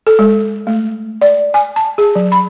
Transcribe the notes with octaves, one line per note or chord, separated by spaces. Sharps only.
A4
G#3
A3
D5
G#5
A5
G#4
F#3
B5